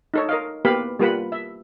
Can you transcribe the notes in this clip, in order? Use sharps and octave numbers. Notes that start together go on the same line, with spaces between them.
D#4 A4 C#5
A#4 D#5 F5
A#3 B3 G4 B4 F5 B5
G3 A#3 F4 B4 F#5 B5
E5